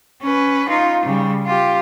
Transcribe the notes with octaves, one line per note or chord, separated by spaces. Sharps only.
C#4 B4
D#4 F4
C#3 G3
F4 G4